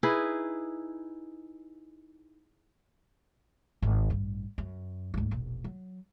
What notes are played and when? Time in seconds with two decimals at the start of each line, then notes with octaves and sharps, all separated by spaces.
0.03 D#4 E4 G#4 B4
3.82 G#1
4.10 A1 G2
4.58 F#2
5.14 D2 G#2
5.31 E1 A#1
5.64 F#3